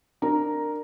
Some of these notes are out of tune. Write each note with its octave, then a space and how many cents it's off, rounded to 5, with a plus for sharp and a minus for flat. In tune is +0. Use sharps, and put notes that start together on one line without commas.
D4 +25 A#4 -10 A#5 +5